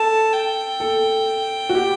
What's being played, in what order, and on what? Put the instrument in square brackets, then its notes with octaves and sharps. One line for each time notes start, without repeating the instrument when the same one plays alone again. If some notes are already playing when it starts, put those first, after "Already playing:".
Already playing: [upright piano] A4 [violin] A5
[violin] G5
[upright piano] A4
F#4
G4